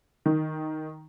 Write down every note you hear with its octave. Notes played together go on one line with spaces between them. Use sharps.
D#3